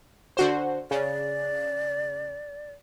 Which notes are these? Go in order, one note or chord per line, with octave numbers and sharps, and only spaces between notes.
D3 F#4 C5
C#3 D5